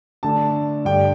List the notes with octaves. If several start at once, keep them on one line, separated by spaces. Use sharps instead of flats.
D3 A3 D4 A5
G2 D3 G3 D4 G5